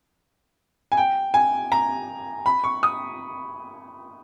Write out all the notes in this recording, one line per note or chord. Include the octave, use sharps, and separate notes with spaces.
G#5
G5
G#5
A#5
B5
C#6
D#6